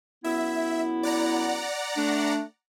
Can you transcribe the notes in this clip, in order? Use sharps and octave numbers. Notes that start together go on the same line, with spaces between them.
F#2 B3 E4 E5
D5 F#5 A#5
A3 D4